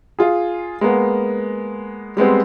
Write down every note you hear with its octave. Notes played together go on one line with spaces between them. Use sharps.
F4 G#4
G#3 A#3 B3
G3 G#3 B3 C4